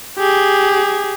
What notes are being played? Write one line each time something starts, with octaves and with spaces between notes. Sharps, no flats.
G4 G#4